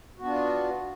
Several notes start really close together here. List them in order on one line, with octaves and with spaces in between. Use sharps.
F#4 B3 D4 F4